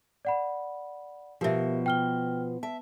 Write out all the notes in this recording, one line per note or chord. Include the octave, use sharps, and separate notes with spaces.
D5 F#5 B5
B2 F3 G4 A#4 E5
G5 F6 G7
E5 A5